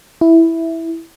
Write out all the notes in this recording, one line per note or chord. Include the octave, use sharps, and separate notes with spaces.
E4